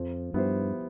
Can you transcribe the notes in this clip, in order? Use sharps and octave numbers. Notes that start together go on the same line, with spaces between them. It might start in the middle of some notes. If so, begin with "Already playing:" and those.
Already playing: F2 F3
G2 B3 E4 G4 C5